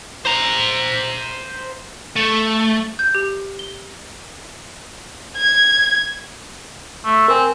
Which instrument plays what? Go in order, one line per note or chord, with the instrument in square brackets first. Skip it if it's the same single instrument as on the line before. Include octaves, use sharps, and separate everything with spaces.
[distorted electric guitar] C5 A#5
A3
[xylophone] G6
G4
G7
[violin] G#6
[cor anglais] A3
[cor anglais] C4 [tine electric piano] A#4 G#5